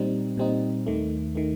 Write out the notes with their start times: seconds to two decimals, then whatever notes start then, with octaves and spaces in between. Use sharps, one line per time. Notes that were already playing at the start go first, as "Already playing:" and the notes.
Already playing: A#2 G3 C4 D#4
0.37 A#2 G3 C4 D#4
0.86 D#2 D#3 A3
1.35 D#3 A3